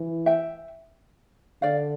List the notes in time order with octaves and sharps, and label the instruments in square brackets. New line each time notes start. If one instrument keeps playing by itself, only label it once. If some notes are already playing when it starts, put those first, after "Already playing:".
Already playing: [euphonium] E3
[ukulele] E5 G5
[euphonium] D3 [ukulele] D5 F5